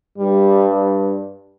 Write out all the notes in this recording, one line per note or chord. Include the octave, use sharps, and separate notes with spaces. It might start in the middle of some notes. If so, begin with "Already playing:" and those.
G2 G3